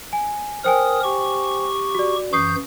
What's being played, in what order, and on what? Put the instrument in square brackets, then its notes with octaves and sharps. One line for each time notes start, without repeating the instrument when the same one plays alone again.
[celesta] G#5
[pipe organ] A#4 D#6 [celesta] C5 G5 G#5
[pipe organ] G4 C#6
[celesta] F#4 D5
[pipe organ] F#2 E3 G6 [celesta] C#6 D#6 C7